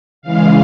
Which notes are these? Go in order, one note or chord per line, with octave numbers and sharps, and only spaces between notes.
C#3 E3 G#3 F5